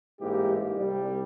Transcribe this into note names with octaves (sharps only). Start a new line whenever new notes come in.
A1 G#2 A#3 E4 G4
C2 G3